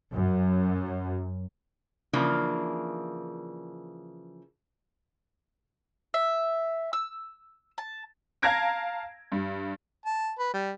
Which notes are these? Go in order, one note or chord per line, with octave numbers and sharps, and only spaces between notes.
F#2
C#3 E3 F3 A#3 D4
E5
E6
A5
F5 A5 A#5 G#6 A#6 D7
G2
A5
B4
G3